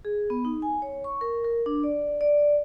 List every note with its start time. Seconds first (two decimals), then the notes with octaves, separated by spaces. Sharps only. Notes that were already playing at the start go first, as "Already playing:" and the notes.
0.05 G#4
0.30 B3
0.45 D#4
0.62 G#5
0.82 C#5
1.04 C#6
1.21 A#4
1.44 A#4
1.66 D4
1.83 D5
2.21 D5